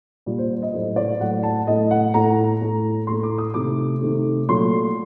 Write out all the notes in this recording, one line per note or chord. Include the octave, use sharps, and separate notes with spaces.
A#2 G3
C5
D#5
A2 F#3 A3 C5
D5
A2 F#3 A3 F#5
A5
A2 A3 D#5
F#5
A2 A3 A#5
A2 A3
A2 A3 C6
D6
D#6
C3 D#3 A3 D6
C3 D#3 A3
A#2 F#3 A3 C6